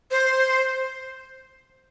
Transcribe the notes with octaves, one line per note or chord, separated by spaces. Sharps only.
C5